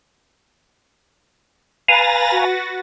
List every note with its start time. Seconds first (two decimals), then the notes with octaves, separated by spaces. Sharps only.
1.88 B4 F5 G#5 A#5 A6 A#6
2.32 F#4